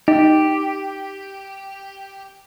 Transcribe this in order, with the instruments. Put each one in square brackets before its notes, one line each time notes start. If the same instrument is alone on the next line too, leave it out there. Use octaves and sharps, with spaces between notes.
[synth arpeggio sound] D#4 [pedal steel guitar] G4